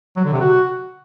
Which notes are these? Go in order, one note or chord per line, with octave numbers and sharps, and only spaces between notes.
F#3
D3
C3
F#4